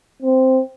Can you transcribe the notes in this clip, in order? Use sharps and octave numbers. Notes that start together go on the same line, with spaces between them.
C4